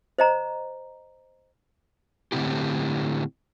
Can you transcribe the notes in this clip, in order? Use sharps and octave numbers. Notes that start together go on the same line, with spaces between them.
C5 D#5 A#5
A2 D3 F3 C4 E4 G4